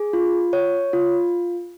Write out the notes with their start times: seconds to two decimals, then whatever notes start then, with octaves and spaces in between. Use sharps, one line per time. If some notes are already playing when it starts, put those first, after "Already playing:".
Already playing: G#4
0.13 F4
0.53 C#5
0.93 F4